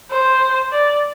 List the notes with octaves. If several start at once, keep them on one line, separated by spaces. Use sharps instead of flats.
C5
D5